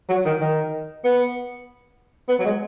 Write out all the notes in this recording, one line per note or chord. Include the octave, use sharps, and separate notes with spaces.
F#3
D#3
D#3
B3
B3
F#3
G#3